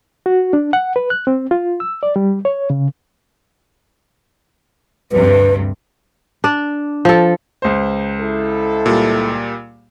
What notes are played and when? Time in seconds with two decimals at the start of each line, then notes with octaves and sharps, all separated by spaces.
0.26 F#4
0.53 D4
0.73 F#5
0.96 B4
1.10 F#6
1.27 C4
1.51 F4
1.80 E6
2.03 D5
2.16 G3
2.45 C#5
2.70 C#3
5.12 D2 G2 C3 B4
6.44 D4 D5
7.05 F3 A4
7.62 C#2 C5
8.20 E4 A4
8.86 A#2 G3